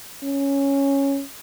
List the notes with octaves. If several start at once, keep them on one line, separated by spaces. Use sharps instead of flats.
C#4